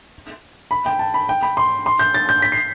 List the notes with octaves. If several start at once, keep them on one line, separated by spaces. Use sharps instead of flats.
B5
G5
A5
B5
G5
B5
C6
C6
G6
A6
G6
B6
C7